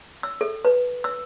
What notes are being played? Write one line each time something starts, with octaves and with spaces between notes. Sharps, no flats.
E6
A4
B4
E6